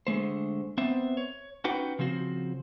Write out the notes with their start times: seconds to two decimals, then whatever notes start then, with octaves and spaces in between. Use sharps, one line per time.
0.07 D3 G#3 A3 C5
0.78 B3 C4 B4 C5 E5
1.17 C#5
1.64 C#4 D#4 F#4 B4 F#5 G5
1.99 C#3 F3 C4 F#4